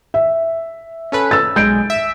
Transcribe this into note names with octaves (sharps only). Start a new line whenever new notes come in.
E5
C#4 A4 B4
E6 A6
B1 G#3 G6 D7
E5